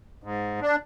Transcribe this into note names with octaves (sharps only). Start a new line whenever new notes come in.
G#2
D4